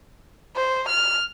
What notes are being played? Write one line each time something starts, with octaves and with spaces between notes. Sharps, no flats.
C5
F6